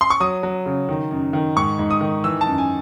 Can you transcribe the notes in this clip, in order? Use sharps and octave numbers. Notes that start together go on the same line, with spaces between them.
C6
C#6
F#3 D#6
F#3
C#3
D#3
F#2
D#3
G#2 C#6
G#2
D#6
D#3
E3 E6
A5
F#2
G#5